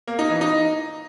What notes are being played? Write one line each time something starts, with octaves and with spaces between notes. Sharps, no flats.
A#3
D#4
E3
D#4